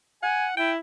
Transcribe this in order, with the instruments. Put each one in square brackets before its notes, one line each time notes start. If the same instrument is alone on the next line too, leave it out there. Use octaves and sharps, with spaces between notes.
[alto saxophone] F#5 [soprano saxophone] G#5
[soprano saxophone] E4 [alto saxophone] G5